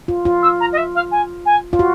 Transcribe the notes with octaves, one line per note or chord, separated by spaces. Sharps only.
F4
F4
E6
A#5
D#5
E5
F5
G#5
G#5
F4
F#4